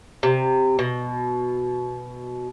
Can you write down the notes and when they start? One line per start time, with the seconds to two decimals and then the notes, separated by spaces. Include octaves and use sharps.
0.23 C3
0.79 B2